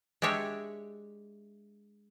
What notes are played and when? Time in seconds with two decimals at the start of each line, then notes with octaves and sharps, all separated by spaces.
0.22 G#3 D4 G4 C#5 E5